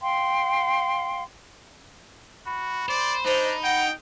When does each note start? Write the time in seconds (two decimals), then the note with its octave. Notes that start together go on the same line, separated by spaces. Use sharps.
0.01 F5 G5 C6
2.46 F#4 B5
2.89 C5 D5
3.25 D4 D#4 C5
3.64 F#5 G5